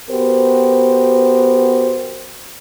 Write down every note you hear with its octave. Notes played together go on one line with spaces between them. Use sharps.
B3 F#4 G4 A#4 C5